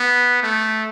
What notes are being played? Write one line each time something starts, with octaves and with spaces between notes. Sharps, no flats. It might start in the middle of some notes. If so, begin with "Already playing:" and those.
Already playing: B3
A3